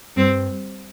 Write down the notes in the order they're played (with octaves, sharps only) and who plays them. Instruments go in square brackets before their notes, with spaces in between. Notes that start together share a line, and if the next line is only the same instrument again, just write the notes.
[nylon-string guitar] G2 [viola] C4